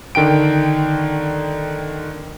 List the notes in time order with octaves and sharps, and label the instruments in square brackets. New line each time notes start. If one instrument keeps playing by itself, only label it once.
[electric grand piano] D3 D#3 G5 D7